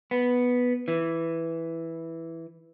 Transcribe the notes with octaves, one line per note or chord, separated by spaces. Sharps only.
B3
E3